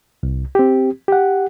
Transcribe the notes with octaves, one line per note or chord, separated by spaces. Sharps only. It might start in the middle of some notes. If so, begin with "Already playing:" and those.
C2
C4 G4
G4 F#5